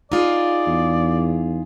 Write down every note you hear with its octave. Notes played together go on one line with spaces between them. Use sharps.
D#4 F4 G#4 D5
E2